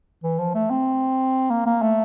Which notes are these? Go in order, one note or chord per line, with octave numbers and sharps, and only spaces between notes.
E3
F3
A3
C4
A#3
A#3
A3